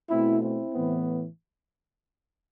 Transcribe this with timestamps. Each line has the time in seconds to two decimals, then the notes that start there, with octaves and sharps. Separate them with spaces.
0.10 B2 A3 C4 E4
0.42 C4 E4
0.74 A2 E3 B3